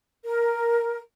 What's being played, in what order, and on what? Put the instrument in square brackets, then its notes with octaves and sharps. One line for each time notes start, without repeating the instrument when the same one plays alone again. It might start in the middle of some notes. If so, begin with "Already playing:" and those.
[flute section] A#4